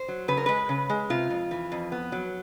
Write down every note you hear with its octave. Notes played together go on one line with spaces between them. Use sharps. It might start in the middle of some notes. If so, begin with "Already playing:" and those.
Already playing: C5
F#3
C#3 B4
A#4
G#3 B4
C#3
G#3
C3 F4
F2
E3
F2
B3
F#3